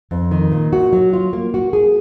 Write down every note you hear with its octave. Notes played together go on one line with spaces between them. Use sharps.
F2
D#3
A#2
F#4
F#3
F4
A#3
F#4
G#4